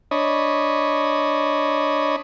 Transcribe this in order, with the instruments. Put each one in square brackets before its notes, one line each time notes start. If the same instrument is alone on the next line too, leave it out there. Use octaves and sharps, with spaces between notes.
[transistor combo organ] D4 C#5 D#5 B5